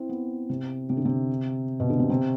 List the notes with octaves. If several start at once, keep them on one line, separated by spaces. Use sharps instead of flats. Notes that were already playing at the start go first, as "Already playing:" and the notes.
Already playing: C4 E4
B3
C3
C3
D3
C3
B2
D3
C3
C3